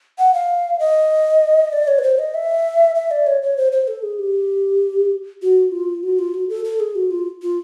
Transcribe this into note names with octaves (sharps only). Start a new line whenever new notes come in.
F#5
F5
D#5
D5
C#5
B4
C5
D#5
E5
E5
D5
C#5
C#5
C5
C5
A4
G#4
G4
F#4
F4
F#4
F4
F#4
A4
A4
G#4
F#4
F4
F4